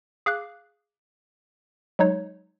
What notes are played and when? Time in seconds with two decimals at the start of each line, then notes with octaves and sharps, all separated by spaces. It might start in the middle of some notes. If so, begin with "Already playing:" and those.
0.26 G#4 F5 D6 F#6
1.99 F#3 G#3 D#4 C#5